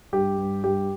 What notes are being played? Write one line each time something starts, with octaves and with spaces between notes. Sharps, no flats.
G2 G4
G2
G2 G4